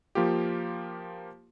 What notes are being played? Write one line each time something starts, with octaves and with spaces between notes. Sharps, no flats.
F3 A#3 F4 G4